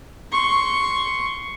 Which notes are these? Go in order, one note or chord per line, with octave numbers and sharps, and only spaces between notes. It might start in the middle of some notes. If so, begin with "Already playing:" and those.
C6 C#6